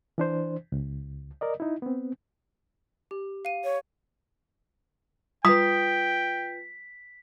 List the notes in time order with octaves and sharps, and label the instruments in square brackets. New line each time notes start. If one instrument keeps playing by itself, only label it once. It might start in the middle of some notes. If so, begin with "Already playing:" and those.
[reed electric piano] E3 D4 C5
C#2
A#4 D5 D#5
D#4 E4
B3 C4
[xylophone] G4
F5 D#7
[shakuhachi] C#5
[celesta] F4 B4 [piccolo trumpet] G5 [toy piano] D#6 [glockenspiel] B6